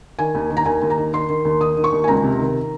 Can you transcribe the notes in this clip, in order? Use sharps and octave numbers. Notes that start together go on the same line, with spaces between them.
D#3 G#5
D#2
D#3
A#5
D#2 G#5
D#2
A#5
D#3
D#3 C6
D#3
D#2
D#3 D#6
D#3
C#6
D#2
G#5
C#2 A#5
C3
D#3